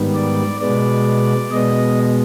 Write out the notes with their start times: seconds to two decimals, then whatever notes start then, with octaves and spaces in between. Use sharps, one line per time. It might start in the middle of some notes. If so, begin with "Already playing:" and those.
Already playing: G#2 D#3 G3 B3
0.15 D5
0.61 B2 G#3 B3 D5
1.51 B2 G#3 B3 D#5